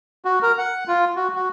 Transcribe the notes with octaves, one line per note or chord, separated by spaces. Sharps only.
F#4
A#4
F#5
F4
F#4
F#4